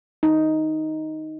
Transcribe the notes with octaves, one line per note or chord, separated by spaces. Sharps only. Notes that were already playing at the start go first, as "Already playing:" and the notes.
D#4